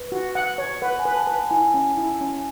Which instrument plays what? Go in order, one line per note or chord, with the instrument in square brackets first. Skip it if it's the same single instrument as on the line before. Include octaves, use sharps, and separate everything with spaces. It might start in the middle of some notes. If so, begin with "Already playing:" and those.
Already playing: [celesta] B4
[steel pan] F#4
F#5
C#5
[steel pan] B4 [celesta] F#5
[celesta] G#5
[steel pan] B4
[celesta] A5
[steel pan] B4
[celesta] A5
[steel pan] E4 [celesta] G#5
[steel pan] C#4
E4
C#4